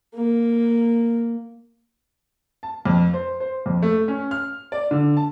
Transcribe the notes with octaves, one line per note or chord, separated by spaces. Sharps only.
A#3
A5
F2
C5
C5
F2
A3
C#4
F6
D5
D3
A5